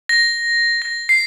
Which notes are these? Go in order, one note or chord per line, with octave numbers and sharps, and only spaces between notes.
A#6
A#6
C7